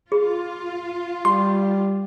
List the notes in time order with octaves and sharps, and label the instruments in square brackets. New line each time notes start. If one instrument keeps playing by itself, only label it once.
[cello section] F4 [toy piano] G#4
[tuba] G3 [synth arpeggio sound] C6